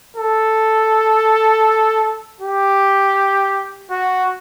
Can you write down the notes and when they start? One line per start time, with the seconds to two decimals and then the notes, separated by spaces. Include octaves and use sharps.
0.16 A4
2.41 G4
3.91 F#4